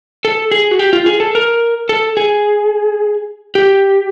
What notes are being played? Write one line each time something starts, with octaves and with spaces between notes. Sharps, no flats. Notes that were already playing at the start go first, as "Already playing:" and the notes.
A4
G#4
F#4
G4
F4
G#4
A4
A#4
A4
G#4
G4